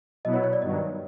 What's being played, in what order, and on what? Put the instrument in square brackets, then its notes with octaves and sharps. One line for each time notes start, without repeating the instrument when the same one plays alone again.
[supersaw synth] B2 F#3 B3 E4 [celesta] D#5
[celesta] C#5
C#5
D5
[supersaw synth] G2 D#3 F#3 [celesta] D#5